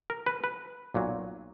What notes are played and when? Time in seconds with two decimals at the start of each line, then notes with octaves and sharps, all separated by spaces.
0.10 A#4
0.26 B4
0.44 B4
0.94 B1 A#2 F#3